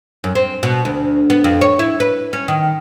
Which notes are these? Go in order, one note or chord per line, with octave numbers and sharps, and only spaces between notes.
F#2
C4
B2
D2
B3
F2
C#5
E4
B4
C#4
D#3